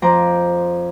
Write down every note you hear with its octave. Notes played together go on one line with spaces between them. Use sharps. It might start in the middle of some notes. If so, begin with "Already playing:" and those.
F2 F3 C5 A#5 D6